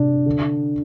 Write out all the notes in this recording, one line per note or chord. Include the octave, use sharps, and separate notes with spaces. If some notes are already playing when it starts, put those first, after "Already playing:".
Already playing: C3 D4
D3